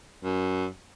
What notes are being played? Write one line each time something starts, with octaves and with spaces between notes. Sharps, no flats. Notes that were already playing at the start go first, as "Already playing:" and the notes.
F#2